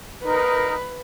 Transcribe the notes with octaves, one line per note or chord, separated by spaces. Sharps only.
D#4 A#4 B4